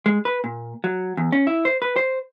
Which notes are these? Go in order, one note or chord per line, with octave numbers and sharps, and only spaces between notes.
G#3
B4
A#2
F#3
E2
C#4
E4
C5
B4
C5